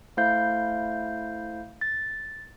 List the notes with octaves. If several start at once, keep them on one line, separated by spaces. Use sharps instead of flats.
A3 E4 C5 F5 G6
A6